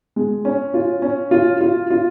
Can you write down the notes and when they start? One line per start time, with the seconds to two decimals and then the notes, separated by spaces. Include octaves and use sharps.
0.16 G#3
0.45 C#4
0.74 F4
1.02 C#4
1.31 F4
1.61 F4
1.90 F4